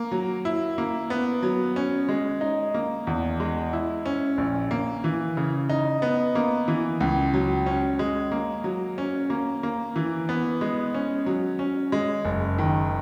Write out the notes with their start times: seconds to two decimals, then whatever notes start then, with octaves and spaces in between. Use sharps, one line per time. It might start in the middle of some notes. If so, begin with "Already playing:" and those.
Already playing: A#3
0.11 F#3
0.45 E4
0.78 A#3
1.10 B3
1.43 F#3
1.76 C#4
2.09 G#3
2.41 D#4
2.74 A#3
3.07 E2
3.40 G#3
3.73 E4
4.06 C#4
4.38 A#1
4.71 A#3
5.04 E3
5.37 C#3
5.70 D#4
6.02 B3
6.35 A#3
6.68 E3
7.00 C#2
7.34 F#3
7.66 C#4
7.99 G#3
8.32 A#3
8.64 F#3
8.98 C#4
9.30 A#3
9.63 A#3
9.96 E3
10.29 B3
10.61 G#3
10.94 C#4
11.26 F#3
11.59 C#4
11.92 G#3
12.25 F#1
12.59 D#3